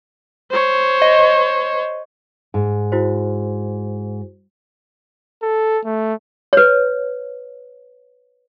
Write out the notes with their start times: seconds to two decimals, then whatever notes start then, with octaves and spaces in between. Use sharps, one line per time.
0.51 C5 C#5
1.02 D#5
2.54 G#2
2.92 E4 F#4 C5
5.43 A4
5.85 A3
6.53 B4 C#5